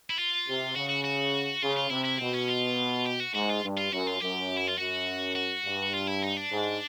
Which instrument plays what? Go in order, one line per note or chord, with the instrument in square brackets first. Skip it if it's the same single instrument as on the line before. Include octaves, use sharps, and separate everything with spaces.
[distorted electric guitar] E4
F4
[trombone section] C3
[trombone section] C#3 [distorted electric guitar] F#4
[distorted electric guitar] F#4
F#4
[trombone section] C#3 [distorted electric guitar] F4
[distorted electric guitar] F4
[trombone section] C3 [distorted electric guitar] E4
[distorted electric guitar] E4
[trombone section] B2 [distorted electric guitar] C4
[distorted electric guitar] C#4
F4
G4
F#4
[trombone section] G#2 [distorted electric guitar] F#4
[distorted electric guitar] F4
[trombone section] G2
[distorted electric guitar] F4
[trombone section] F#2 [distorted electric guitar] F#4
[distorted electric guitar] F4
[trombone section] F#2 [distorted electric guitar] G4
[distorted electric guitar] E4
F4
[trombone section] F#2 [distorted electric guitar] F#4
[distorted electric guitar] F#4
[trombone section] G2
[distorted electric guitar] F4
E4
D#4
D4
[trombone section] G#2